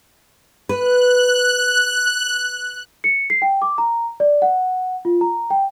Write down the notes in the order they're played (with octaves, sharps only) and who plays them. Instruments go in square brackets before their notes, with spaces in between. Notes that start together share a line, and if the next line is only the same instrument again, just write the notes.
[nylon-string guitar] B4 [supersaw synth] F#6
[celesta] C#7
C7
G5
D6
A#5
D5
F#5
F4
A#5
G5